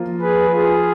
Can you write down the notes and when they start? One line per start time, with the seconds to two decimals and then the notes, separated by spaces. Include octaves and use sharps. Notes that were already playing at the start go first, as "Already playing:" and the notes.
Already playing: F3 A#3 F4
0.21 G#4 B4
0.50 F4 G#4